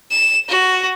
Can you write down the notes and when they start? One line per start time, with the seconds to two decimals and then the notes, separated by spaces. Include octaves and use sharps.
0.11 E7
0.49 F#4